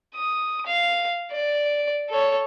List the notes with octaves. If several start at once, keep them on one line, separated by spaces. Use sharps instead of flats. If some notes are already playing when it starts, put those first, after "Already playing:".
D#6
F5
D5
A4 C#5